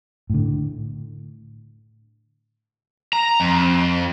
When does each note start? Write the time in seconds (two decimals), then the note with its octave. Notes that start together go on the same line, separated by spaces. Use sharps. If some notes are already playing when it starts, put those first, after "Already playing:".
0.30 A2 D3
3.13 A#5
3.40 F2